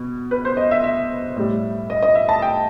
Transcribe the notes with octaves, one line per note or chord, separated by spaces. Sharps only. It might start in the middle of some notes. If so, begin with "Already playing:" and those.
Already playing: B2
B4
C5
D#5
E5
E5
A2 G3
D#5
D#5
E5
A5
G5